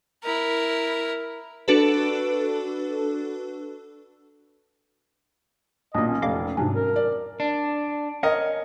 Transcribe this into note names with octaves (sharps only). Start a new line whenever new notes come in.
E4 A#4
D4 F#4 A4 B4
B1 A#2 D4 D#5
C#4
F1 D#5 F5 D6
G#2 C3 F#3 C#4 D4
A#4
D5
D4
C#4 A#4 D#5